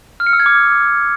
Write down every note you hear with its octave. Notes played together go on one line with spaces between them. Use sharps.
F6
C#7
E6
G#6
D6